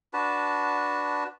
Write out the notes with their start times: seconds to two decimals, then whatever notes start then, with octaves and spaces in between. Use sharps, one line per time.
0.13 D4 F#4 B4 A5